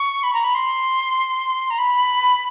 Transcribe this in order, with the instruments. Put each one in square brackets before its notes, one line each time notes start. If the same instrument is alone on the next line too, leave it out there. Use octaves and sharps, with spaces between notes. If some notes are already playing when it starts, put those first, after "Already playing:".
Already playing: [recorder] C#6
B5
A#5
B5
C6
A#5
B5